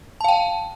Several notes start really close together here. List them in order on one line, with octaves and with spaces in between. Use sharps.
A5 F5 G5